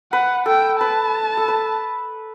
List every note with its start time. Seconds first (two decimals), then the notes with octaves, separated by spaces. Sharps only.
0.12 B4 F#5
0.46 A4 G5
0.80 B4 A5
1.37 A4
1.48 B4